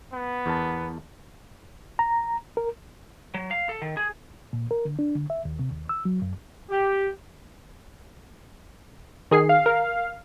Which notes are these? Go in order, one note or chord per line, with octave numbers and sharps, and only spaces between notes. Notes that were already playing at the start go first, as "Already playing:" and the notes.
B3
E2 A#4 A5
A#5
A#4
F#3
F5
A4
D#3
G#4
A#2
A#4
D3
D4
D3
E5
D#2
C3
D#2
E6
F#3
F#2
G4
D#3 G#4 C7
F5
A#4